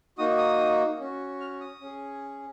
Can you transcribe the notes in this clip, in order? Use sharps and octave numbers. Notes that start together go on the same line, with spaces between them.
A#3 D#4 F#4 D#6
D#6
C#4 F#4
F6
D#6
C#4 G#4